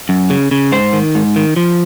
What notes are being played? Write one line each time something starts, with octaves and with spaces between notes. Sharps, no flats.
F#2
C#3
C#3
G#2 C5
D#3
G#2
D#3
F3